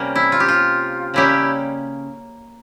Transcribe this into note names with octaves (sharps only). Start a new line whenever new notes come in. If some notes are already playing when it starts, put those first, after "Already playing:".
Already playing: C3 G3 A#3 C#4
E4
F4
G4
F4
C#3 G3 A#3 C#4 E4 G4